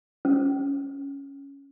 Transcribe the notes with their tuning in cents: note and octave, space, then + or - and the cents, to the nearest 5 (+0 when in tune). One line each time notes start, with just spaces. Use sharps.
C#4 +5